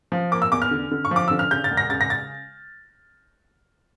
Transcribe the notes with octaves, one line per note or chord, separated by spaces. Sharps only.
F3
A#3 D6
E6
E2 D6
F6
D3
D3
C#6
F3 D6
D3 E6
F6
C#3 G6
A6
E1
A#6
C#3 A6
A#6
A6